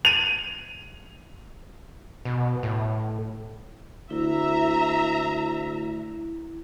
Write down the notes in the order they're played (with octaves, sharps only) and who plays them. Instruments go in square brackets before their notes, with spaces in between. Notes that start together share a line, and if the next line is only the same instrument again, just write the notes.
[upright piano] D#7 F7
[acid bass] B2
A2
[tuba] D2 [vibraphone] E4 [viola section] E5 A#5